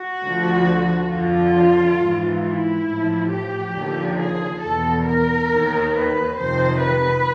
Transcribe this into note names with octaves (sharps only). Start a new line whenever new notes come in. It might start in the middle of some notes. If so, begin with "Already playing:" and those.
Already playing: F#4
D2 D3 F3
F2 D3 F3 F4
G#2 E3
E4
A2 F3
G4
D#2 D3 F3
G#4
E2 B2 A4
A#4
D#2 D#3
B4
F2 C3 D#3 C5
B4